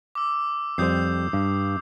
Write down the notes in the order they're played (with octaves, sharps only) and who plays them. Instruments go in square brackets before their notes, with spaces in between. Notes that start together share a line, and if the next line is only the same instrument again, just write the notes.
[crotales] D6 E6
[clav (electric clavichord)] F2 G3 C5 [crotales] D#6 G6 C7
[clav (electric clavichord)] G2